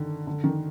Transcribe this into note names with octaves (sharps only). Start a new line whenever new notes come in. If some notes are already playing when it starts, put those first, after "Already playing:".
Already playing: D3 D#3
D3
D#3